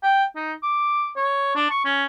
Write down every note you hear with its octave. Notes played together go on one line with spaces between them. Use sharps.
G5
D#4
D6
C#5
D4
C#6
C#4